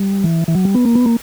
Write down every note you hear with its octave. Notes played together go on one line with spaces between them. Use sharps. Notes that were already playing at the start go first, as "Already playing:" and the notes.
Already playing: G3
E3
E3
F#3
G3
B3
A#3
B3
A#3